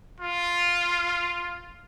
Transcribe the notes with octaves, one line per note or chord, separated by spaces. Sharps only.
F4